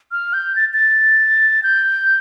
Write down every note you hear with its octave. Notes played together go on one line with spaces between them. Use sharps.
F6
G6
A6
A6
G6